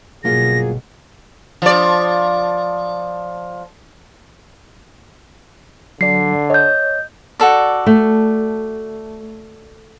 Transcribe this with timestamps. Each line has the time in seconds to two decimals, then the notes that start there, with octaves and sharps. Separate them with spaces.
0.24 G1 B2 F#3 A#3 F4 G#4 A#6
1.62 F3 D5
6.01 D3 F#3 D5 C7
6.50 C#5 D#5 G6
7.40 F#4 A4 D5
7.87 A3